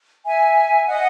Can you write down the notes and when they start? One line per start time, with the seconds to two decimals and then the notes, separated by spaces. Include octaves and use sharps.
0.26 E5 G#5
0.88 D#5 F#5